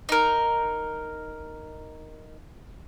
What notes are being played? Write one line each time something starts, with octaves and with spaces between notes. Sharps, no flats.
D#4 A#4